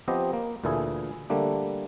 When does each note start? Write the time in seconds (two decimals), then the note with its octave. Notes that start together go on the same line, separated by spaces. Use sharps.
0.08 F3 B3 C4 G4 D#5
0.33 A#3
0.64 D2 A#2 E3 A3 E4 G#4
1.30 D3 G3 A3 A#3 D4